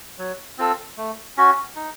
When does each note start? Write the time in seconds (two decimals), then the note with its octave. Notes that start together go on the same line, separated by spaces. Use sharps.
0.18 F#3
0.58 C4 F4 A4
0.98 A3
1.37 C#4 F#4
1.76 D#4